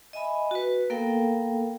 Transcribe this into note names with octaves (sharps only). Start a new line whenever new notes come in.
D#5 E5 G#5 B5
F#4 B4
A#3 B3 A4 A#4 F5 G5